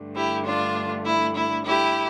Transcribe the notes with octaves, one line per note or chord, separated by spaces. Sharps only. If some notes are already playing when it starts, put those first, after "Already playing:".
Already playing: G2 D3 A3
E4 G4
D4 F4
E4
E4
E4 G4